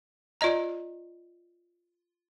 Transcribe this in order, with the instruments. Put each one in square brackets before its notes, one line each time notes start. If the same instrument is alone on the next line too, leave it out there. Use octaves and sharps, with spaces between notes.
[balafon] F4 D5 D#5 A#5